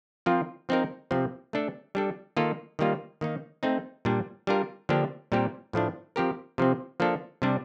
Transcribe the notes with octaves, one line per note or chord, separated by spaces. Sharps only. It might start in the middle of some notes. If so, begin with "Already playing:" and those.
F3 C4 F4 A#4
F3 C4 D#4 A#4
C3 F3 C4
A3 D4 A4
G3 D4 A4
D#3 A#3 F4 A4
D#3 G3 A#3 F4
D#3 A#3 D#4
A3 C4 D#4
A#2 G3 D4
G3 D4 F4 A#4
D3 F3 A#3 D4 G4
A#2 G3 C4 G4 A#4
A2 F3 A3 D4
F3 C4 G4 A#4
C3 F3 C4
F3 A#3 D4 A4
C3 G3 D4